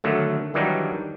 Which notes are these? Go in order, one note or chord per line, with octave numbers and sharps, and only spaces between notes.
D3 D#3 F#3 A3
D#3 E3 F#3 G3 D4 D#4